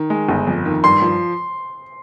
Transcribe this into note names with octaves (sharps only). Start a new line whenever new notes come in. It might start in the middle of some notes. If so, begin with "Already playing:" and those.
Already playing: D#3
G#3
G1
F2
D#3
G2 C6
F3